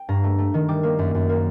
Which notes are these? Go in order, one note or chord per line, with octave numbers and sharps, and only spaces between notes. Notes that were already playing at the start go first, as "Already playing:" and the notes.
Already playing: G5
G2 A#5
A3
A3
D#3
G3 D6
A#3
F#2
F#2
A#3